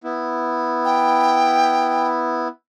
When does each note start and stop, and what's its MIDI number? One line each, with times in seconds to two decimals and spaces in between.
0.04 2.48 59
0.04 2.48 64
0.85 2.08 79